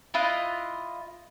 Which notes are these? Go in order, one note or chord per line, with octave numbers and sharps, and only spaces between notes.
E4 F4 D#5 F#6